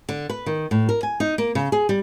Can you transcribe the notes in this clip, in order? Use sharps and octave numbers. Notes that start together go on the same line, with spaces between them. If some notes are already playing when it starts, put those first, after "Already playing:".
D3
B4
D#3
A2
A#4
G#5
D#4
A#3
C#3
G#4
G3